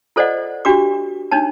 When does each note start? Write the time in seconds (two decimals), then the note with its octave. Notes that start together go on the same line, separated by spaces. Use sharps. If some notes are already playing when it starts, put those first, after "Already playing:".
0.16 F4 A4 C5 D5 D#5 F#5
0.65 D4 F#4 G4 C#6 D6
1.31 D4 D#4 C#5 A5